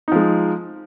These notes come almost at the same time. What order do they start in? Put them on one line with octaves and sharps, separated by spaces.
D#4 F3 G#3